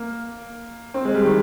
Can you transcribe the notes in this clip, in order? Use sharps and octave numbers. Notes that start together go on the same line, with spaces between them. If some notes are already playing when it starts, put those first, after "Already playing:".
Already playing: A#3
C4
G#3
G3
D#3